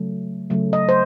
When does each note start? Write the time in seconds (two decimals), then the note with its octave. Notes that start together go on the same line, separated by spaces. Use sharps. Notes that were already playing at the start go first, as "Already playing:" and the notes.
Already playing: C#3 F#3 A3
0.50 C#3 F#3 A3
0.73 D#5
0.89 C5